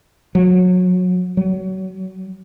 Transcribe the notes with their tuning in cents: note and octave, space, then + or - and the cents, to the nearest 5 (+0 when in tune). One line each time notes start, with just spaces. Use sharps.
F#3 -25
F#3 +25